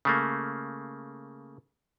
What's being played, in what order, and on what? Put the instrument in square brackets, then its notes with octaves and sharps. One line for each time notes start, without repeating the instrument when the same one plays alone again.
[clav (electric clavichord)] C#3 A3 A#3